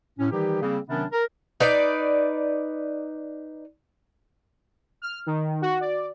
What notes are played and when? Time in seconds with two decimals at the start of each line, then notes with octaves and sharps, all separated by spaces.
0.19 A2 C#4
0.31 D#3 E3 G3 D#4 G4
0.62 C#3 G3 A#3 C4
0.89 C3 D#3 F#3 B3 C#4 D4
1.12 A#4
1.60 D#4 B4 D5
5.02 F6
5.26 D#3
5.62 F#4
5.81 D5